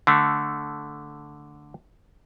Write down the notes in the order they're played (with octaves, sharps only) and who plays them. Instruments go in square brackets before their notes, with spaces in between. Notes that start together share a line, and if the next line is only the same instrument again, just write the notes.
[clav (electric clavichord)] D3 A3